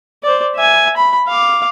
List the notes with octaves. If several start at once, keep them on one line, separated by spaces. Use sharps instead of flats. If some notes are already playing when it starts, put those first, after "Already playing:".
C5 D5
E5 G#5
B5
F5 D6